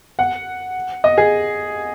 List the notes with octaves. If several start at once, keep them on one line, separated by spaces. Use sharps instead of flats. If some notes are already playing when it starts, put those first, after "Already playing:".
F#5
D#5
G#4